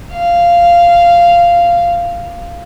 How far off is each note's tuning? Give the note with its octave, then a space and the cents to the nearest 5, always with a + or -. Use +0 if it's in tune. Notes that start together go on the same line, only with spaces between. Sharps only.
F5 -10